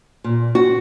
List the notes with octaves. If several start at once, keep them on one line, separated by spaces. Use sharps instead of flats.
A#2
F#4